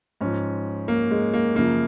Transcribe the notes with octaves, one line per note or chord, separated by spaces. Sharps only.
G#2 F3 C#4
A#3
G#3
A#3
F#2 C#3 F3 A#3